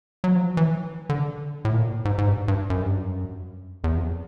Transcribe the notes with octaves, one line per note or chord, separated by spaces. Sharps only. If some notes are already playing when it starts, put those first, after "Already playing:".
F#3
F3
E3
D3
A2
A#2
G#2
G#2
G2
G2
F#2
G2
F#2
E2
F2